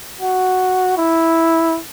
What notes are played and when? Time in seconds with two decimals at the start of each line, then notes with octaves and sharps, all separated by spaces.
0.21 F#4
0.97 E4